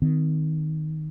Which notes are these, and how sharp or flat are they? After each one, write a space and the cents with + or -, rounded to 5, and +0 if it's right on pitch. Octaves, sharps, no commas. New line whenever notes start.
D#3 +0 C4 -45